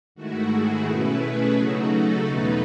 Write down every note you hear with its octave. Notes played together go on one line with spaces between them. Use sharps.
G#2 D#3 A3 E4 F#4
G#4
B2 A3 C#4 E4 B4
G#4
C#3 F#3 A3 D#4 F#4
A4
E2 B2 F#3 A3 D#4 B4